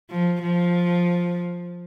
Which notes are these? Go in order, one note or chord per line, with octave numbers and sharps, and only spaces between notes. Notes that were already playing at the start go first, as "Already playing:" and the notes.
F3
F3